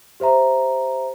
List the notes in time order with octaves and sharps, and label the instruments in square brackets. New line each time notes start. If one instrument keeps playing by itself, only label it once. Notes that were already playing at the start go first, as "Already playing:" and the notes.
[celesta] G4 C5 E5 A#5